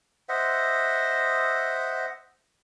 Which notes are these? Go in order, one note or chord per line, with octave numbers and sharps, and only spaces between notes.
C5 D#5 E5 F#5